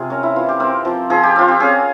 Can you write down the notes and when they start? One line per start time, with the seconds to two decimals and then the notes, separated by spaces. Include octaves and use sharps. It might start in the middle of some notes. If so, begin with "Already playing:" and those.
Already playing: C3 F4 G#4
0.10 C#4 A#4
0.23 E4
0.36 E3 F4
0.49 G4
0.60 C4 A#4
0.85 F3
1.10 F3 G#4
1.23 G4
1.36 C4 F4
1.48 G4
1.60 C#4 G#4